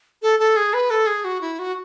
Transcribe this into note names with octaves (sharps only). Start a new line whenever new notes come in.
A4
A4
G#4
B4
A4
G#4
F#4
E4
F#4